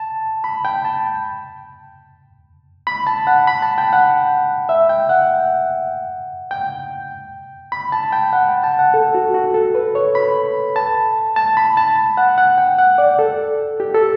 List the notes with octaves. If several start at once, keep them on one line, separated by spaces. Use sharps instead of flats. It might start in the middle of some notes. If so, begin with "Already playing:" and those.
Already playing: A5
B5
G5
A5
B5
A5
F#5
B5
A5
G5
F#5
E5
G5
F#5
G5
B5
A5
G5
F#5
G5
A5
F#5
A4
F#4
F#4
A4
B4
C#5
B5
A5
A5
B5
A5
F#5
F#5
G5
F#5
D5
A4
G4
A4